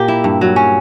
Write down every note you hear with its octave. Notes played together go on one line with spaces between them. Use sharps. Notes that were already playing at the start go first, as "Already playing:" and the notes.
Already playing: A#2 A#3 G4
E4
G2
F#3
C#4